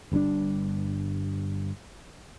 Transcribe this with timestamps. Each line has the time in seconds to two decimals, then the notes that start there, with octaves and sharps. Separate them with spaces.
0.12 G1 G2 C3 D4